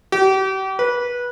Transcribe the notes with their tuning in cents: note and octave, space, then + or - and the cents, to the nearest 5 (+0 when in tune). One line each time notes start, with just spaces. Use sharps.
G4 -40
B4 -20